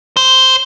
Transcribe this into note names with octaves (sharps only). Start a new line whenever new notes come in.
C5